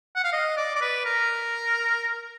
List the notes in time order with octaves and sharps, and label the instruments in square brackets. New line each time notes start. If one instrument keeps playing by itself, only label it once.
[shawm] F#5
F5
D#5
D5
D5
B4
A#4